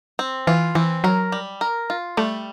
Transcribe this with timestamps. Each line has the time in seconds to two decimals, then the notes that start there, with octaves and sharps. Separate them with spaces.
0.19 C4
0.47 E3 F4
0.75 E3 C4
1.04 F#3 A#4
1.32 G3
1.61 A#4
1.90 F4
2.17 G3 A3